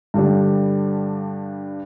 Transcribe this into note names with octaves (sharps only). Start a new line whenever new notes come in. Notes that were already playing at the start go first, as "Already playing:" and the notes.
G2 D3 G3 D4